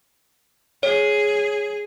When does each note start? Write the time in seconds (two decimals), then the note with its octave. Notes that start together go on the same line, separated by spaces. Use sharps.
0.83 G#4 C#5